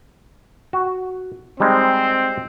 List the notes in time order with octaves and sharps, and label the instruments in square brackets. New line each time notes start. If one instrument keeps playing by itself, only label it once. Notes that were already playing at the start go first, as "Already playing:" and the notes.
[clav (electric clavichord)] F#4
[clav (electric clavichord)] G3 G#3 D#4 [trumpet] C4